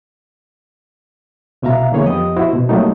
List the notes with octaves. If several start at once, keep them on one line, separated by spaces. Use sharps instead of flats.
C2 B2 E5 F5 A#5
D3 E3 A#3 B3 G#4 C#5
F2 F3 B3 G4 D#5 D#6
E4 F#4 C5
B2
F#3 G3 A3 A#3 C4 D#4